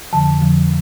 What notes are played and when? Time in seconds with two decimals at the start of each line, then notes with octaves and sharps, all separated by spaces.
0.12 F2 D3 F3 A5
0.41 F2 D3 F3